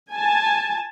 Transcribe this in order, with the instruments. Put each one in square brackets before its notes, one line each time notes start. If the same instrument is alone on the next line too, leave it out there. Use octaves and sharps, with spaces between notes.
[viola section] G#5 A5